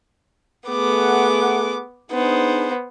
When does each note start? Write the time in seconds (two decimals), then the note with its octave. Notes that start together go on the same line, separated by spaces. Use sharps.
0.68 A3 B3 G#4 F#5 D6
2.11 B3 D4 D#4 G#4 C5